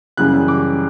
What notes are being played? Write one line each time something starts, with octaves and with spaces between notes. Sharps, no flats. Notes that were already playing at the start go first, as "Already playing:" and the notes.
F#2 C#3 E3 G3 F#6
D6